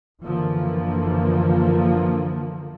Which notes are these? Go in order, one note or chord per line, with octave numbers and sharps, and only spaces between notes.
F#1 D3 E3 F3 A#3